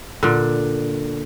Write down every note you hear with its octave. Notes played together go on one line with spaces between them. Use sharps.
A#2 D3